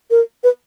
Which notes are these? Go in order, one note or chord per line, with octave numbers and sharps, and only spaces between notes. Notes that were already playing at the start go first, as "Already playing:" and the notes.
A#4
B4